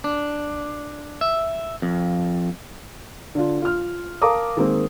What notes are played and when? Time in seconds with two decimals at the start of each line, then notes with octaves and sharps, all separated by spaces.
0.04 D4
1.21 E5
1.82 F2
3.35 D3 D4 F4
3.62 F4 F6
4.22 A#4 F5 A5 A#5 D6 D#6
4.57 D#3 G#3 A#3 C4